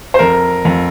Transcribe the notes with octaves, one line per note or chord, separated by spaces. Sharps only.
C5
F2 A#4
F2